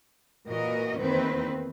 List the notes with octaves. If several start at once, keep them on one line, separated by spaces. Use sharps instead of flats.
A#2 E3 F#4 A#4 D#5
E2 D#3 A#3 C4 B4